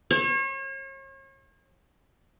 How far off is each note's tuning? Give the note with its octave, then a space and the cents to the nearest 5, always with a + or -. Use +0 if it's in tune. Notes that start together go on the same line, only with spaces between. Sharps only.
C#5 -40